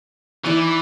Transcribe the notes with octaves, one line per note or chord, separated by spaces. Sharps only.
E3 D#4 E4 D5